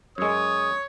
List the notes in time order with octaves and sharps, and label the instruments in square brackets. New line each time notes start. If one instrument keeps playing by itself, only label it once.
[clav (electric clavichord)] F#2 G#3 [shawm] C#5 [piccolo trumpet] D#6